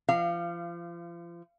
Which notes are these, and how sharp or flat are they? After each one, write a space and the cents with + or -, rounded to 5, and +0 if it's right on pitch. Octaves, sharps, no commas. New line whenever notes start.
F3 -35 F5 -20